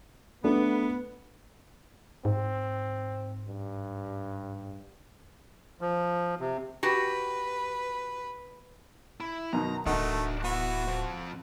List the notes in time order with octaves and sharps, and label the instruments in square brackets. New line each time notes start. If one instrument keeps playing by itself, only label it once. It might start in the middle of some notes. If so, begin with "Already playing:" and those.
[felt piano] A3 D4 [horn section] B3
[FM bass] G#2 [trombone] C4
[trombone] G2
[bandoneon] F3
C3
[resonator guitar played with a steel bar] F#4 G4 [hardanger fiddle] B4
[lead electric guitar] E4
[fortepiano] F#2 B2 D#3 [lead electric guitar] A#5
[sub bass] D1 [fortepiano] D#3 D#4 F#5 [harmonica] A3 [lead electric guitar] D4 F#4
[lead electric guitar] B3 E4 [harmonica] F#4
[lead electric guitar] F3 C4